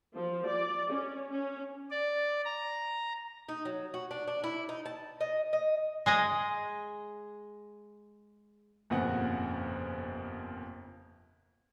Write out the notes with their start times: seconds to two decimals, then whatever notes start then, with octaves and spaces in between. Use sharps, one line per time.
0.15 F3
0.46 D5
0.91 C#4
1.31 C#4
1.91 D5
2.45 A#5
3.49 D#4
3.65 F#3
3.94 F#4
4.11 D4
4.27 D4
4.44 E4
4.69 D#4
4.86 A5
5.21 D#5
5.53 D#5
6.06 G#3 G#4 D#5
8.90 G1 F2 A#2 C#3 F#5 G#5